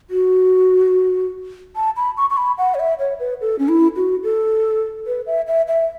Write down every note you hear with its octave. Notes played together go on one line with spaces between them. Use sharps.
F#4
A5
B5
C#6
C#6
B5
F#5
C#5
E5
C#5
B4
A4
C#4
E4
F#4
A4
B4
E5
E5
E5